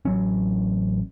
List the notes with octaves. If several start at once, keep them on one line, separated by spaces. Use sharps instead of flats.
A1 F#3 C#4